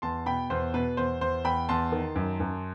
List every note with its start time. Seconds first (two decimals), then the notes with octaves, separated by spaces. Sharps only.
0.02 E2 A5 C6
0.26 B2 G5 B5
0.50 E2 C5
0.74 B2 B4
0.97 E2 C5
1.21 E2 C5
1.44 E2 G5 B5
1.69 E2 A5 C6
1.92 D#3
2.16 F#2
2.40 F#2